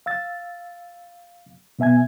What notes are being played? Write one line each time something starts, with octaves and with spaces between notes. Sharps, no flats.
F5 E6 A6
B2 B3 E5 G#5 G#6